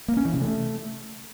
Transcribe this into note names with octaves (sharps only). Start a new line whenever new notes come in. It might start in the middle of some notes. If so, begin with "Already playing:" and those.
A#3
C#4
E3
C3
A3